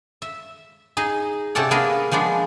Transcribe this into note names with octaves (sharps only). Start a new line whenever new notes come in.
E5
D#4 G#4
C3 C#4 A4 D5 F#5
A#3 B3 D4 G#4 A#4
F3 G#3 B3 D4